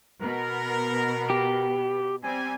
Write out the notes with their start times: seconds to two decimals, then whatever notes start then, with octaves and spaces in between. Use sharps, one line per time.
0.23 B2 B3 A#4
1.30 G4
2.24 G3 C4 G#5